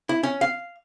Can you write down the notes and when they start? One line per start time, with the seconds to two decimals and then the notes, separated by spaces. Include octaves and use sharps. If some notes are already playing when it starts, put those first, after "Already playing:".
0.09 E4
0.23 C#4
0.41 F5